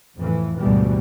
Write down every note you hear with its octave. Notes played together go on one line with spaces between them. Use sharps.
F2 A2 E3
D2 G#2 B2 D3 E3 G3